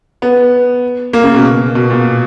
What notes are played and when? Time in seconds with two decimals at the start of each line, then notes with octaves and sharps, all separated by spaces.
0.22 B3
1.13 A#3
1.24 C#3
1.34 B2
1.75 B2
1.90 A#2